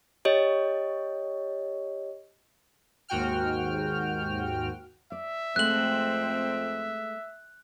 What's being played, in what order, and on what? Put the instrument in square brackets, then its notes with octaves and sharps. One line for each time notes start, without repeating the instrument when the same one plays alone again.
[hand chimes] G4 C#5 D#5
[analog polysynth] D#2 G#2 F#4 G5 F6
[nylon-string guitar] D5 [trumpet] E5
[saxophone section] F2 C4 [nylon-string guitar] G#3 A3 B3 [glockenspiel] F#6 F#7